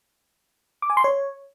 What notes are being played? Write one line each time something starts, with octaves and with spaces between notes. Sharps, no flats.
D6
G#5
C6
C#5